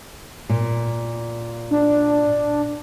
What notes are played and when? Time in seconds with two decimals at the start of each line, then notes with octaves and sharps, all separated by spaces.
0.49 A#2
1.71 D4